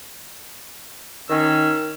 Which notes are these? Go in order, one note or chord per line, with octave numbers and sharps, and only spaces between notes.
D#3 C#4 E6